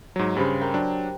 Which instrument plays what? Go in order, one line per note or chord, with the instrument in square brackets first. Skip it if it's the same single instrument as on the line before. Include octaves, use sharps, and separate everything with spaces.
[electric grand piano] G#2 F#3
[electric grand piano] G2 C#3 [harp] G4 B4 C5
[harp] A#4 G5
[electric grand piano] F#3 D4